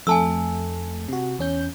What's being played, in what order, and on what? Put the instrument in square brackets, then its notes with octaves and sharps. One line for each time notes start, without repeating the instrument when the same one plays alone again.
[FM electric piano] F2 A3 [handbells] G#5 A5 E6
[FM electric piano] C3 F#4
E2 C#4 G6